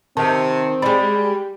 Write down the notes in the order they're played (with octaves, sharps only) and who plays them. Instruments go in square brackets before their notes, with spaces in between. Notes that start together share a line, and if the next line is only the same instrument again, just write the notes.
[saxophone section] C3 [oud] D#3 [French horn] C4 [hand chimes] A5
[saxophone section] G3 [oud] G#3 D5 [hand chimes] B5
[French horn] G4